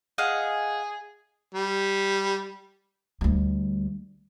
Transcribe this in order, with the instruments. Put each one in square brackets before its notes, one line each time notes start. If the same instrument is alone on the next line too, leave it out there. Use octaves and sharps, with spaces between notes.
[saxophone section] G#4 [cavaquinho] D#5 F5 F#5
[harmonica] G3
[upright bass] D2 G3